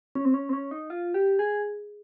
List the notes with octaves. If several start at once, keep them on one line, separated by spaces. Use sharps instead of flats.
C#4
C4
C#4
C4
C#4
D#4
F4
G4
G#4